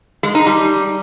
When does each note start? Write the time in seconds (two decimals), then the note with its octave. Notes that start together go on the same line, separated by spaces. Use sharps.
0.23 G#3
0.35 D#4
0.46 G3